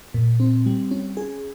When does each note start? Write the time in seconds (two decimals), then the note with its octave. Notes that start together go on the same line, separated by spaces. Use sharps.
0.14 A#2
0.40 C4
0.66 G3
0.91 C#4
1.17 G#4